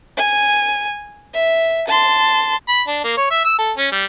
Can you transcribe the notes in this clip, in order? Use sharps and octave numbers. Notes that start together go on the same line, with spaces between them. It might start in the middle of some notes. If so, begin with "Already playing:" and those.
G#5
E5
A5 C6
B5
D4
A#3
C#5
E5
E6
A4
C#4
G3